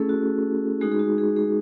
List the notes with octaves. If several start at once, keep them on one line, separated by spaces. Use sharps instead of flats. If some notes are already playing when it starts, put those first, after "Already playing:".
Already playing: A3 C#4 E4 G#4 A4
F#4
G#3 D#4 F#4 G#4
G#4
F#4
G#4
G#4